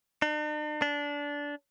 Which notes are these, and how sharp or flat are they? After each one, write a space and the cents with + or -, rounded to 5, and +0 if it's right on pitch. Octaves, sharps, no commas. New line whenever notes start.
D4 +45
D4 -20